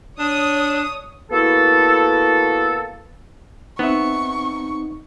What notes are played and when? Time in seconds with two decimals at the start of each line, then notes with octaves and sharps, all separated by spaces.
0.19 D4 C#5 D#6
1.31 A#3 B3 E4 F#4 A4
3.79 B3 C4 D#4 E5 C#6